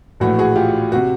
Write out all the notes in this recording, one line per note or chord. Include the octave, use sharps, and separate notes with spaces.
A#1 A2 E3 A3 F#4
F#4 G#4
F4 G4
C3 F#4